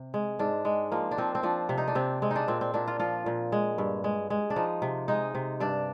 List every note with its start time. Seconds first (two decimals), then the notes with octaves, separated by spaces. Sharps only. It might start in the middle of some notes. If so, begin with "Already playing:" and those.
Already playing: C3
0.14 G#3
0.39 G#2 D4
0.65 G#3
0.92 F3 A#3
1.11 D4
1.18 F3 C4
1.35 C4
1.43 F3 D4
1.69 C3
1.78 D#4
1.88 D4
1.95 C3 C4
2.22 G#3 C4
2.31 D4 D#4
2.48 A#2 C4
2.61 C4
2.74 A#2 D4
2.88 F4
2.99 F3 F4
3.26 A#2
3.52 G#3
3.78 G2
4.04 G#3
4.30 G#3
4.50 D4
4.56 F3 D#4
4.82 C3
5.08 G#3 D#4
5.35 C3
5.60 G2 D4